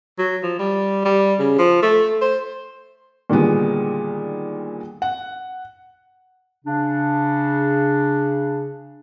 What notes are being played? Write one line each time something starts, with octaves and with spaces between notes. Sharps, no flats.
F#3
F3
G3
G3
C#3
F3
A3
C5
A#2 D3 D#3 G3 G#3 B3
F#5
C#3 D4